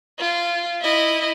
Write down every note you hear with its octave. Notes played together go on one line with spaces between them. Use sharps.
F4
E4 D#5